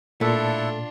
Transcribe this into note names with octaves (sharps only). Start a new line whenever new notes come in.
A#2 A3 D4 E4 F4 A4 F#5